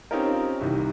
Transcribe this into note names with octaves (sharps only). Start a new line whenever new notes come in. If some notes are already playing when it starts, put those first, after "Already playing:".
C4 C#4 D#4 F4 G4 A#4
C2 C3 D#3 E3